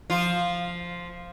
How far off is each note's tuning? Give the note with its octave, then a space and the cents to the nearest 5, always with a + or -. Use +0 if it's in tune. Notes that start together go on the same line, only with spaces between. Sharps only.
F3 +0 F4 +0